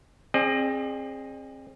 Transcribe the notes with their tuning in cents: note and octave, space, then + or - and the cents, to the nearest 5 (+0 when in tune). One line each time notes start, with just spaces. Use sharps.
C4 +30 G#4 +0 D5 +40